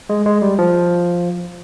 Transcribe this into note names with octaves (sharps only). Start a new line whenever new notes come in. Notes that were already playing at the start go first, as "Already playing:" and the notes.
G#3
G#3
G3
F3